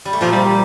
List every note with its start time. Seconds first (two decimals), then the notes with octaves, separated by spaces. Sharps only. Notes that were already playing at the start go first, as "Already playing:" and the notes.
0.05 G3
0.13 A3
0.21 A#2 F3 A#3
0.33 G3
0.45 G3